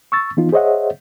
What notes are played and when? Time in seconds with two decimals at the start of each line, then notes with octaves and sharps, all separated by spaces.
0.12 C#6 E6 A6
0.37 E3 B3 D#4 F4
0.52 G#4 C5 C#5 D#5 E5 F#5